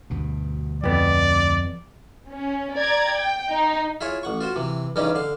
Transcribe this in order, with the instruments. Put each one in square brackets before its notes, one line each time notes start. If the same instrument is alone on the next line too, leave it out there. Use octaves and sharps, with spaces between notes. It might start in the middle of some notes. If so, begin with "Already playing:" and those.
[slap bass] D2 G2 B2
[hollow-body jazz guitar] F2 B3 [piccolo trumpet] D5
[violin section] C#4
D5 A#5 G#6
G5
D#4
[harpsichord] E4 F4 G#4 C#5
A1 F#5 C#6
F4 F#4 C5
C3 E3
G2 C#3 E3 G3 C#4 D#4
D3 F5